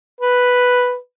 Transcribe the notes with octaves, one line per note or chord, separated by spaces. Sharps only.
B4